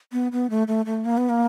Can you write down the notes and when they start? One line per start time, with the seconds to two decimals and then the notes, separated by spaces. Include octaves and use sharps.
0.13 B3
0.32 B3
0.50 A3
0.67 A3
0.86 A3
1.05 A#3
1.17 B3
1.29 A#3